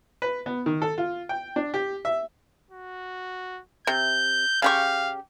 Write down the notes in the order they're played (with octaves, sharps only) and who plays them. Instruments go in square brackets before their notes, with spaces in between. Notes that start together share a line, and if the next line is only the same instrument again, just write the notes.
[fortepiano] B4
B3
D#3
A4
F4
G5
D4
G4
E5
[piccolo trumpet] F#4
[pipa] C3 [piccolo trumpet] G6
[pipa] C#3 G4 C#6 [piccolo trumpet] F5